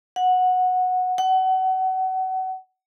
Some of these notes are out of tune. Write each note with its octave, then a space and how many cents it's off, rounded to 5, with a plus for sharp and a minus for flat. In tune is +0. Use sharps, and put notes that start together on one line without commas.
F#5 -10
F#5 +30